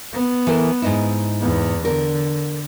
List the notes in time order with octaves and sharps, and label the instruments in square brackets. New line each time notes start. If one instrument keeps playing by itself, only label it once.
[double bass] B3
[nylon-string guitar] E3 A4 A#4
G#2 D#4 E4
[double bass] E2 B3
[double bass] D3 [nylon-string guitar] A#4